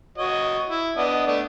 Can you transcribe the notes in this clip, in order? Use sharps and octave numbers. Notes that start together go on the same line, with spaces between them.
F#4 C#5 D#5
E4
B3 D4 D#5
A3 B3 D4